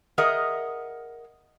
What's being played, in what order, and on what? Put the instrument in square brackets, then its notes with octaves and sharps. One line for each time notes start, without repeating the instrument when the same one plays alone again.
[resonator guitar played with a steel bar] G#4 A#4 D#5 E5 F#5